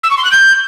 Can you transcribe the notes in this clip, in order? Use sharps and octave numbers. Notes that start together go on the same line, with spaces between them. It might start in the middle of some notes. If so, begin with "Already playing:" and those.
E6
C#6
C6
F#6
G6